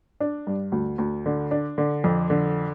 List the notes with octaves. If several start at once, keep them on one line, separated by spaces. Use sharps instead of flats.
D4
G2
D2
D2
D3
D4
D3
F2
D3